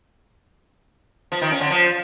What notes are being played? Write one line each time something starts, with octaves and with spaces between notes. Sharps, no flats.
F3
D#3
C#4
D3
F3